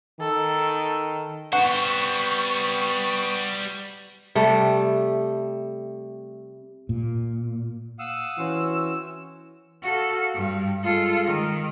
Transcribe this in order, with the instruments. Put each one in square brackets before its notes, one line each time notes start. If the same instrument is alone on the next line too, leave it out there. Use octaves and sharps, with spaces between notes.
[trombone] D#3 [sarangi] A4
[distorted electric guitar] G3 C5 [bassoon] B3 [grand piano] F#5 [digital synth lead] C#6
[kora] C3 G3 A3
[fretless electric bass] A#2
[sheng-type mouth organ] F5 F#5 D#6 [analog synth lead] E6
[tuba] E3 [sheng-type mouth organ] C4 C#4 F#4
[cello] F#4 A4 [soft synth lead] F5
[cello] G2
[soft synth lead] G#3 [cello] F4 A4
[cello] D#3